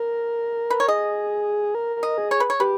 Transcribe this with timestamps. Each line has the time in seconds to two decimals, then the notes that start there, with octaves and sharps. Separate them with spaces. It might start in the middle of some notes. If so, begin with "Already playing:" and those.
Already playing: A#4
0.70 B4
0.80 C#5
0.88 G#4 D#5
1.75 A#4
1.96 A#4
2.03 D#5
2.18 G#4
2.31 C#5
2.40 B4
2.50 C#5
2.60 G4 B4